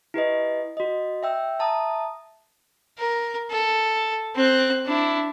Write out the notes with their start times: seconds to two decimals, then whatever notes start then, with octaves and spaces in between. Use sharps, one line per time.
0.14 E4 G4 B4 D#5
0.77 F#4 D#5
1.23 E5 G5 E6
1.59 E5 A5 A#5 D#6
2.98 A#4
3.50 A4
4.35 C4 F#6
4.86 D4 E4